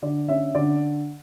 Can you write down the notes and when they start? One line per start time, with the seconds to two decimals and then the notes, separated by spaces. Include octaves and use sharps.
0.02 D3 D5
0.28 C#4 E5
0.55 D3 D5